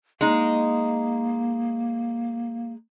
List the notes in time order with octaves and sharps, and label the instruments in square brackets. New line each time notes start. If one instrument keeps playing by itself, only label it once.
[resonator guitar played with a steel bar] G#3 D#4 [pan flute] A#3